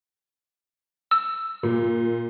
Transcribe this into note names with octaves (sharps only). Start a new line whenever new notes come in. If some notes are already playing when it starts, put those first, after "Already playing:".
E6
A#2